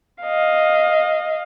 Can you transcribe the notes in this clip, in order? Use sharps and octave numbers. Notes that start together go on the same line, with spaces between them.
D#5 F5